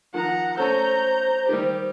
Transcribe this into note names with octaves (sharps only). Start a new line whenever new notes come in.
D#3 F3 F#5 A#5
A3 C#4 A4 C5 A#5 G6
D#3 G3 G4